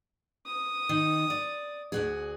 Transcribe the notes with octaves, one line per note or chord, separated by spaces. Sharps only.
D#6
D#3
D5
D2 F#4 G#4